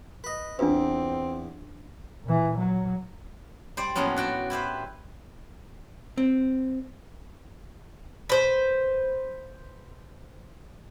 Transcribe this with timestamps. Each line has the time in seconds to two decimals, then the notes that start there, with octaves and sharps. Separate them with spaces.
0.24 B4 D#5
0.59 E2 C4 D4 F4 B4
2.24 A#2 E3
2.59 F#3
3.77 G3 C5 D5
3.95 A2 F3 F#3 A#3 B3 C#4
4.16 D4 F#4 G5 A5
4.50 E4 G4 B4 C5
6.18 C4
8.29 B4 C5